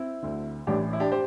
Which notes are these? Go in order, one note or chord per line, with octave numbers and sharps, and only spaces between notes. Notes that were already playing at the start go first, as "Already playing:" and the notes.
Already playing: C4 E4
D2 D3
A1 A2 E3 D4 G4
E4
D4 G4
G4 C5